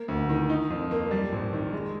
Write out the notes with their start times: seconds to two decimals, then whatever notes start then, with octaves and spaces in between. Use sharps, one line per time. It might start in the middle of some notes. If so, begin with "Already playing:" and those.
Already playing: A#3
0.08 D2
0.29 D#3
0.49 D#4
0.70 F2
0.91 A#3
1.11 G3
1.32 A#1
1.53 D#3
1.72 G#3